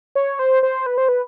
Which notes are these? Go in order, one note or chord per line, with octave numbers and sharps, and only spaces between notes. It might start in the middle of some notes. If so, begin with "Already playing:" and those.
C#5
C5
C5
B4
C5
B4